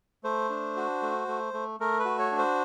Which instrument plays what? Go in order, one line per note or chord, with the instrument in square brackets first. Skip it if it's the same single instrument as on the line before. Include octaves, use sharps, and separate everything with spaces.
[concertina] A3 C5
D4
F#4
A3
A3
A3
A3 A#4
B4
F#4
C#5
D4
C5